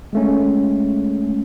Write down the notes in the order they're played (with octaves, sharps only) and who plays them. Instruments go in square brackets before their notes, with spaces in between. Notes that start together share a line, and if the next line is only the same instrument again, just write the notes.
[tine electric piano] G#3 A3 C#4